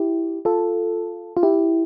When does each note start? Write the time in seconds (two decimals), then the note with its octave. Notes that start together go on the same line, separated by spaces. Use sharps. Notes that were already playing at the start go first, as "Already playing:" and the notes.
Already playing: E4 G4
0.45 F4 A4
1.37 F4
1.43 E4 G4